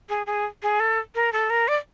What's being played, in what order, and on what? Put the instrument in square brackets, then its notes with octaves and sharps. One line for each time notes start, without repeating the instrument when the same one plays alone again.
[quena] G#4
G#4
G#4
A4
A#4
A4
A#4
D5